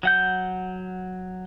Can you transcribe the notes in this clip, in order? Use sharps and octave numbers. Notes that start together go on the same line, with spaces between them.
F#3 F#5 G6